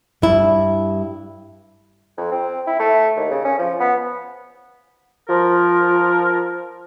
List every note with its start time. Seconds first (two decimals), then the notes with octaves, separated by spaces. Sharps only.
0.22 G2 E4
2.17 F2
2.32 C4
2.67 E4
2.79 A3
3.17 D#2
3.31 C#3
3.44 C#4
3.59 F3
3.80 B3
5.29 F3 A#4